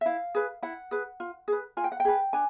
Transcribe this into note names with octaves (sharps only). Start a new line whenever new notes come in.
E5
E4 F5
G#4 B4
E4 F#5
G#4 B4
F4
G#4 B4
F4 G#5
G5
F#5
G5
G#4 B4
D4 G#5